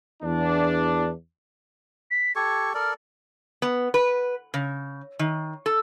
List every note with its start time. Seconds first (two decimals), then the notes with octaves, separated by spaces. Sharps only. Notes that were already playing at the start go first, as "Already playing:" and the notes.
0.22 E2 D4
2.11 B6
2.36 G4 A4 C#6 G#6
2.74 A4 A#4 D5 F6
3.62 B3
3.94 B4
4.54 C#3
5.19 D#3
5.66 A4